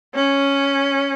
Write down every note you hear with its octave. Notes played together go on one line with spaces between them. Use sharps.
C#4